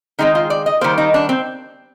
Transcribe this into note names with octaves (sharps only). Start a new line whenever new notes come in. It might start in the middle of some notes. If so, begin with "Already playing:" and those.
D#3 G#3 C4 D#4
F4
D5
D#5
D#3 G3 A#3 C5
D#4
D4
C4